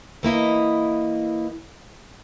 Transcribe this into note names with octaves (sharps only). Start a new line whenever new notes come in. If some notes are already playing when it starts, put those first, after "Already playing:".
E3 A#3 E4 D#5